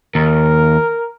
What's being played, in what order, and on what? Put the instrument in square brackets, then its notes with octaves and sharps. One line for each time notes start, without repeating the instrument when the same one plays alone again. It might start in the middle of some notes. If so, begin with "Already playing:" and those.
[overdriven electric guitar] D#2 [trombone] A#4